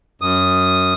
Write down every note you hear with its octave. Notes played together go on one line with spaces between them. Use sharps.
F#2 D#6